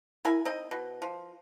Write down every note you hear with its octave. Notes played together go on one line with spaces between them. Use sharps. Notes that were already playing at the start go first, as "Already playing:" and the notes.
E4 A#4 G#5
C4 D#4 D#5
B2
F3